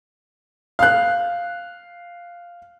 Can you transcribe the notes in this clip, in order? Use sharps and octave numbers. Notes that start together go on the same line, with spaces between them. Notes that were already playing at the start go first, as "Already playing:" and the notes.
F5 F#6